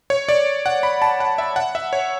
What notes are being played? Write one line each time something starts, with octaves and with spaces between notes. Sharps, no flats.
C#5
D5
F#5
B5
A5
F#5
E5
F#5
E5
C#5